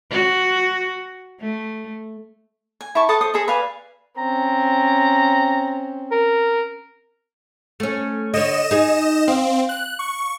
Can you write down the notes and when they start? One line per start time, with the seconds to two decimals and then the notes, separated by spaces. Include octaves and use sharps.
0.10 F#4
1.40 A3
2.81 G#5
2.95 E4 A5 C#6
3.09 A4 B4 A5 D#6
3.21 A4 C5 D#6
3.34 G#4 A4 C5 D#5
3.48 B4 D5 F5 G#5
4.18 C4 C#4 A#5
6.12 A#4
7.80 A3 C#4
8.34 D3 C#5 D#5 E7
8.71 D#4 G#4
9.28 C4 F5
9.69 F#6
9.99 C#6